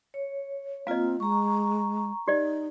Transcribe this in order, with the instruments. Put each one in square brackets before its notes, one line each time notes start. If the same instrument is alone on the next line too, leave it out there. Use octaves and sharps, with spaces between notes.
[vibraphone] C#5
[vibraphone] A#3 F4 [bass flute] C4 [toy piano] D#5 F5
[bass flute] G#3 [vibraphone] A#5 C#6
[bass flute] D#4 [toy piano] G4 D5 D#5